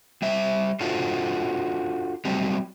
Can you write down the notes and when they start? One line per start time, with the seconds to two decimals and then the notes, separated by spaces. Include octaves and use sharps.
0.22 G3 C5 E5
0.80 D4 F4 F#4 A4 C5
2.25 F#3 G3 A3 C4 G4